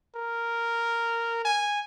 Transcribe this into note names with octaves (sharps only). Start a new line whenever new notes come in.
A#4
G#5